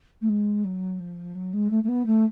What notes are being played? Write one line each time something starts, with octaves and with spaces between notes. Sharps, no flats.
A3
G#3
F#3
F3
F#3
G#3
A3
A3
B3
A3